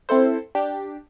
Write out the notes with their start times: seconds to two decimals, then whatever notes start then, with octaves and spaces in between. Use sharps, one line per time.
0.09 C4 E4 A4 C5
0.55 D4 G4